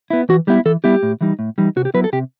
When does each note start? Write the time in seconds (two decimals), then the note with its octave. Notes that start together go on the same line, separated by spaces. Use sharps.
0.10 B3 E4
0.29 E3 F#4
0.47 G3 B3 E4 G4
0.66 E3 A4
0.84 G3 B3 E4 G4
1.03 A2
1.21 E3 G3 D#4
1.39 A2
1.58 E3 G3 D#4
1.76 C3 F#4
1.85 G4
1.94 F#3 B3 E4 B4
2.04 A4
2.13 C3 G4